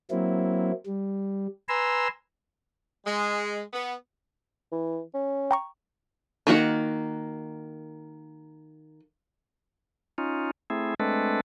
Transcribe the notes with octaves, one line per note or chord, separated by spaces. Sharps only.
F#3 A#3 C4 E4
G3
B4 G#5 A#5 C6 E6
G#3
B3
E3
C#4
G5 A#5 C#6
D#3 A#3 F#4 F#5
C#4 D#4 F4
A3 C4 E4 G#4
G#3 A3 C4 D4 A4 B4